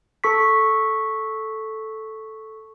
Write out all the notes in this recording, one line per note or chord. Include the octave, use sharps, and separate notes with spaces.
A4 C#6 B6